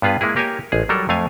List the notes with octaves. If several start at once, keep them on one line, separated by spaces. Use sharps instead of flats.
G2 B3 F4 G#4 B4
G#3 A#3 E4 G#4
A#3 G4 A#4 C#5 G#5
A1 G#4
F#3 G3 A4 A#4
F2 A3 F5 G#5